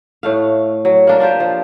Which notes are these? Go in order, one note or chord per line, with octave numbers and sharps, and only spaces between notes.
A2 A3 F5
F#3
A#3 D4 A#4
D4 F4 G4 C5
F3